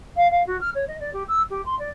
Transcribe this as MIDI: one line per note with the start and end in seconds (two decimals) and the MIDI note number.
0.16 0.27 77
0.30 0.44 77
0.46 0.59 66
0.60 0.70 89
0.74 0.84 73
0.87 0.98 75
0.99 1.10 74
1.13 1.23 67
1.27 1.42 88
1.50 1.63 67
1.65 1.77 84
1.78 1.89 74